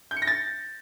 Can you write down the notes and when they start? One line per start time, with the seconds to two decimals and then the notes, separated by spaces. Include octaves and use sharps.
0.11 G6
0.17 C#7
0.22 A#6
0.27 A6